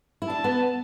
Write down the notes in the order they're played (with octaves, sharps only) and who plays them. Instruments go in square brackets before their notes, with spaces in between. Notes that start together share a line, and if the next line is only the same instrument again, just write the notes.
[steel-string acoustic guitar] E4
[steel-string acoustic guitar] D4 [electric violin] A5
[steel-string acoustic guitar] B3